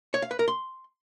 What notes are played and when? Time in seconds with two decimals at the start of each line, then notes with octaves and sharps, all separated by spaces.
0.14 C#5
0.22 F5
0.31 B4
0.39 A#4
0.48 C6